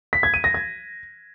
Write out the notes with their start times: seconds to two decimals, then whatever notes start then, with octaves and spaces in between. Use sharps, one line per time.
0.13 B6
0.23 G#6
0.34 D#7
0.44 A#6
0.54 G#6